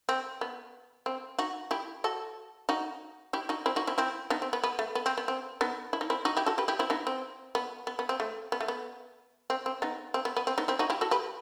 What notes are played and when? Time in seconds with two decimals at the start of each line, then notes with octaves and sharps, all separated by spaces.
0.09 C4
0.41 B3
1.06 C4
1.39 D#4 F#4
1.71 E4 G4
2.04 F#4 A4
2.69 D#4 F#4
3.33 E4 G4
3.49 D#4 F#4
3.66 C4 E4
3.76 D#4 F#4
3.87 C4 E4
3.98 C4 E4
4.30 B3 D#4
4.42 C4
4.53 B3
4.64 B3
4.79 A3
4.95 B3
5.06 C4
5.18 B3
5.28 C4
5.61 B3 D#4
5.93 E4
6.01 D#4
6.10 C4 E4
6.25 D#4 F#4
6.37 E4 G4
6.46 F#4 A4
6.58 G4 B4
6.68 E4 G4
6.79 C4 E4
6.90 B3 D#4
7.07 C4
7.55 B3
7.87 B3
7.99 B3
8.09 C4
8.20 A3
8.52 B3
8.61 A3
8.68 B3
9.50 C4
9.66 C4
9.82 B3 D#4
10.14 C4
10.25 B3
10.37 B3
10.47 C4
10.58 B3 D#4
10.68 C4 E4
10.79 D#4 F#4
10.90 E4 G4
11.01 F#4 A4
11.11 G4 B4